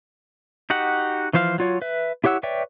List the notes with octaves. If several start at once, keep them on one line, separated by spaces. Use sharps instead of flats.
D#4 F#4 G4 F#5
E3 F3 C5 F5 F6
F#3 F4 C#5
B4 E5
E4 G4 C#5 F#5 E6
B4 C#5 D5 E5 G5